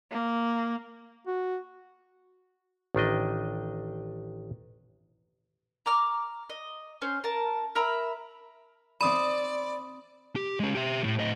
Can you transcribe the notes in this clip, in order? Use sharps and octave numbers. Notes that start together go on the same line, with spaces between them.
A#3
F#4
A1 D#3 D4 D#5
A#5 D6 F6
D#5
C#4 C5
A#4 A5
A#4 E5 A#5 B5
C4 D5 B5 D#6 D#7
G4
G#3 C#4
G4 E5
A2
A2 D#5